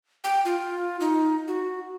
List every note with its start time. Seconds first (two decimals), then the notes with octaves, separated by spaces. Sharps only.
0.24 G5
0.45 F4
1.00 D#4
1.48 F#4